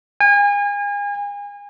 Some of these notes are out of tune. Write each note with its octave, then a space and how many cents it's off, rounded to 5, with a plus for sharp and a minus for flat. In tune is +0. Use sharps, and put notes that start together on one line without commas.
G#5 -35